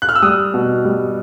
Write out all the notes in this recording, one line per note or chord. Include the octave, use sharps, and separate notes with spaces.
F#6
F6
E6
G3 D#6
B2
G3